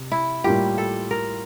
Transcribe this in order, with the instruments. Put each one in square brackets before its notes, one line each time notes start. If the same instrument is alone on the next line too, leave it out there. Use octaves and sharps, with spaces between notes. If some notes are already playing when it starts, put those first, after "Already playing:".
Already playing: [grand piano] C3
[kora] E4
[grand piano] A2 G3 A#3 F4 [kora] G4
[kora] A4
A#4